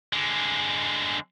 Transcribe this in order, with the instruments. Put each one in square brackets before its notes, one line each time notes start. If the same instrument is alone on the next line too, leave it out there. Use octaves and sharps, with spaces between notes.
[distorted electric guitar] D3 G#3